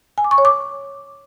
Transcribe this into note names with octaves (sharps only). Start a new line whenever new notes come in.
G#5
D6
C#6
C#5
D6